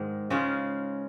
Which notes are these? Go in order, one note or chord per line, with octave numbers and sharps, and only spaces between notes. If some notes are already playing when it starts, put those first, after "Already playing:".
Already playing: G#2 D#3 G#3
C#3 G#3 C#4 F4